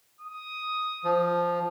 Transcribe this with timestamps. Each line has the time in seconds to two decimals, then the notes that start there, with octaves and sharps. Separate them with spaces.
0.21 D#6
1.05 F3